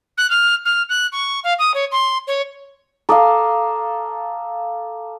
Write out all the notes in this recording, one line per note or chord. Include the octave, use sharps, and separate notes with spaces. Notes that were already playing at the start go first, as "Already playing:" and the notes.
F#6
F6
F6
F#6
C#6
F5
D#6
C#5
C6
C#5
A4 F5 A#5 D6 D#6